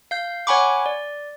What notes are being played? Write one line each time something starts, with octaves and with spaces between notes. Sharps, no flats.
F5 G6
C#5 F#5 G#5 B5 C#6 D6
D5